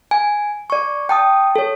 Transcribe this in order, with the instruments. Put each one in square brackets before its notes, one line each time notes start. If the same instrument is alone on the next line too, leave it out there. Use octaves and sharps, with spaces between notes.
[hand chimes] G#5
D5 C#6
G5 A5 D#6
A4 C#5